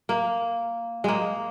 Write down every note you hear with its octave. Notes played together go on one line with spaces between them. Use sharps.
A#3
G#3 A#3